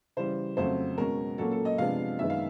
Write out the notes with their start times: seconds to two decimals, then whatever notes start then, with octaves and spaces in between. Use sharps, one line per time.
0.17 C#3 E3 G3 C5
0.57 F2 C#3 F#3 A3 C5
0.98 B2 G#3 C#4 A#4
1.38 A#2 F#3 A#3 C#4 A4
1.52 A4
1.65 D#5
1.78 C3 F3 G#3 B3 D4 F5
2.19 F#2 D#3 G#3 B3 E5
2.30 F5